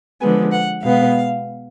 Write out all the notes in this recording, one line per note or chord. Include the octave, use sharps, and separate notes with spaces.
D3 F3 G#3 B3 G#5
F#5
B2 G#3 B3 F5